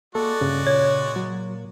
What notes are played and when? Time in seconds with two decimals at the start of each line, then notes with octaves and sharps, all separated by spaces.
0.15 G#3 A#3 F#4 A4 D5
0.41 G2 C#3
0.67 A#2 C#5
1.16 F#3